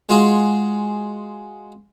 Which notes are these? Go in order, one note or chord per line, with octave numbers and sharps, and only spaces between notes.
G#3 F4 F#4 G#4